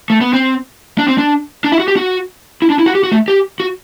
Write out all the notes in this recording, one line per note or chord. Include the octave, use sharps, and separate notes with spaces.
A3
B3
C4
D4
C4
D4
D4
E4
F#4
G4
F#4
E4
D4
E4
F#4
G4
F#4
A3
G4
F#4